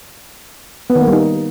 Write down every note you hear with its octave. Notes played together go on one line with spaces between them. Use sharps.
B3
D#3
A#3
G3
D#4